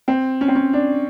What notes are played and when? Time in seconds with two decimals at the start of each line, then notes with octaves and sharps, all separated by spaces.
0.08 C4
0.41 C#4
0.48 C4
0.55 C#4
0.73 D4